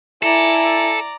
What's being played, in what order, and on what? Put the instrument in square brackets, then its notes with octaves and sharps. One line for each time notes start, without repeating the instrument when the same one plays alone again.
[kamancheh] E4 G#5 [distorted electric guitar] A4 [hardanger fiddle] D5 A#5